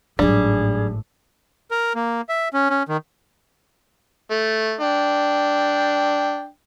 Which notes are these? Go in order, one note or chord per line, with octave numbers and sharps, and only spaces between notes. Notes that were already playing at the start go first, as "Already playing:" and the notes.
G#1 A2 F#3 G3 D4 G#4
A#4
A#3
E5
C#4
C#4
D#3
A3
D4 G5